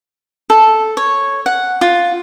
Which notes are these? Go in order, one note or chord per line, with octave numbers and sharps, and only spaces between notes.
A4
C#5
F#5
F4